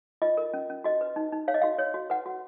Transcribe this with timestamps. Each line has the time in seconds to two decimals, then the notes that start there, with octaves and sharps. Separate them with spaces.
0.22 F4 D#5
0.37 A#4
0.53 C#4
0.70 C#4
0.84 F#4 D#5
1.01 B4
1.16 D#4
1.33 D#4
1.48 C#5 F5
1.54 D#5
1.62 F#4 F5
1.78 C#5
1.94 F#4
2.10 B4 F#5
2.26 F#4